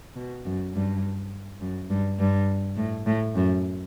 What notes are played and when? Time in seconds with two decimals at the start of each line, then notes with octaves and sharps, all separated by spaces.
0.16 B2
0.45 F#2
0.74 G2
1.61 F#2
1.90 G2
2.19 G2
2.77 A2
3.06 A2
3.35 F#2